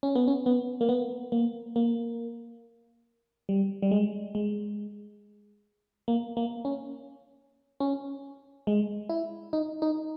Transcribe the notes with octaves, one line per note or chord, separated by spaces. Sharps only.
C#4
B3
C#4
B3
A#3
B3
A#3
A#3
G3
G3
G#3
G#3
A#3
A#3
C#4
C#4
G#3
E4
D#4
D#4